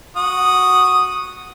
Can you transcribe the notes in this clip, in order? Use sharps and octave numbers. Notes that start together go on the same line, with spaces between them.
F#4 D#6